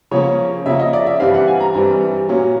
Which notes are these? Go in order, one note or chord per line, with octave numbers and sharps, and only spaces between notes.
C#3 F3 A#3 C#4 C#5
C#3 F3 A#3 C#4 E5
D#5
D5
E5
G2 E3 G3 C4 F5
F#5
G#5
A#5
G2 E3 G3 C4
A#2 F#3 A#3 C#4